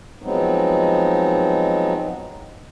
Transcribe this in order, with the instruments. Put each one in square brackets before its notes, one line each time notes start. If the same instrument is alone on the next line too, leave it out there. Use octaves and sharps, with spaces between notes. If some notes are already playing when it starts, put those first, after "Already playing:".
[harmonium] F3 F#3 G#3 B3 C4 D#4